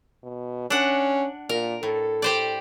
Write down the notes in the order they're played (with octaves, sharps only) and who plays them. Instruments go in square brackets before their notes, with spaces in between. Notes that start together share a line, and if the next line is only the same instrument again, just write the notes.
[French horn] B2
[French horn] C#4 [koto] D4 F#5
[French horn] A#2 [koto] A#4
[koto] A2 [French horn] A4
[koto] G4 C5 D5